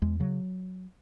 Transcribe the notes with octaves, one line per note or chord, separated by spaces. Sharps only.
E2 G#3
C#3 F#3